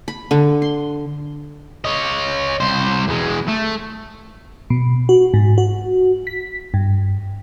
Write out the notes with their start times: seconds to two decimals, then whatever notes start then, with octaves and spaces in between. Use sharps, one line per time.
0.08 B5
0.31 D3
0.62 C6
1.85 C#5 D#5
2.60 C2 C5
3.08 E2 G#3
3.48 A3
4.70 B2
5.09 F#4
5.34 G#2
5.58 F#4
6.27 B6
6.74 G2